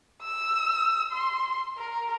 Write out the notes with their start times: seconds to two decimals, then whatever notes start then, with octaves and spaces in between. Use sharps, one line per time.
0.22 E6
1.12 C6
1.78 A#4